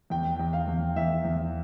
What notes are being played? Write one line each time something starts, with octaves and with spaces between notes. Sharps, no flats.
E2 G5
E2
F5
E2
E2 E5
E2